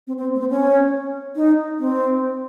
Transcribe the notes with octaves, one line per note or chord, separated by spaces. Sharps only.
C4
C4
A#3
C4
C#4
D#4
C4